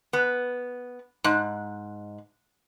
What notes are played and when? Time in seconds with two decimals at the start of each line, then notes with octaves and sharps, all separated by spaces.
0.13 B3
1.24 G#2